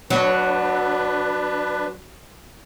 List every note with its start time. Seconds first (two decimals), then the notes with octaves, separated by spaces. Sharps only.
0.10 F#3 D4 B4